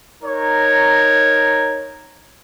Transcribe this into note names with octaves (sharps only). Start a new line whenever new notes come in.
D#4 A#4 C#5